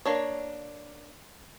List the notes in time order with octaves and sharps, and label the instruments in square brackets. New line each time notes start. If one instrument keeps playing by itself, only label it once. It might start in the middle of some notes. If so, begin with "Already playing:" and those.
[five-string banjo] A#3 D4 C#5